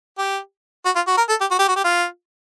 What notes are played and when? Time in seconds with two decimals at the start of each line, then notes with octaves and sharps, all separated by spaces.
0.18 G4
0.85 F#4
0.96 F4
1.07 F#4
1.18 A#4
1.29 A4
1.41 G4
1.51 F#4
1.59 G4
1.68 F#4
1.76 G4
1.85 F4